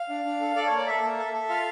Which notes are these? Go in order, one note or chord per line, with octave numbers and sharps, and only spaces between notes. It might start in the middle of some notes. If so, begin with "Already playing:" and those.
Already playing: F5
D4
D4
A4
A4 D5
A#3 C#5
D5
A4 E5
A#3
A4
A4
F4 F5